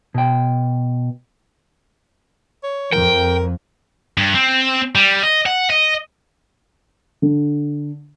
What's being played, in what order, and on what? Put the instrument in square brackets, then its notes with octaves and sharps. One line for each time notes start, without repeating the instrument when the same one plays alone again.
[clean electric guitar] B2 G5
[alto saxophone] C#5
[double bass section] F2 [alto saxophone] A#4 [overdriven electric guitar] G5
[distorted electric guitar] G2
C4
G3
D#5
F#5
D#5
[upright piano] D3